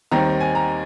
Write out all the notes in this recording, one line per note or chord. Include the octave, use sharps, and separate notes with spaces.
D#2 D#3 G3 C4 A#5
G#5
A#5